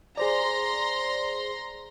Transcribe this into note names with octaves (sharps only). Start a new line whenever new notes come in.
G#4 C5 D5 A#5 C6